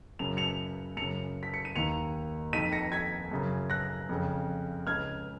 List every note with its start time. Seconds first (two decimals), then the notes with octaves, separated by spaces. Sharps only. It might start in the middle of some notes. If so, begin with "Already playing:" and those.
0.19 F#2 C#3 F7
0.37 C#7 F7
0.97 F#2 C#3 C#7 F7
1.43 B6
1.54 C#7
1.65 D#7
1.76 D#2 D#3 C#7 F7
2.53 F2 D#3 B6 D#7
2.72 A#6 C#7
2.92 G#6 B6
3.32 F#2 C#3
3.70 F#6 A#6
4.09 F2 C#3
4.87 C#2 C#3 F6 G#6